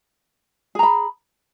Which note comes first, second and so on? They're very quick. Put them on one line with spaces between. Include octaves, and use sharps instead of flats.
G#4 A#5 B5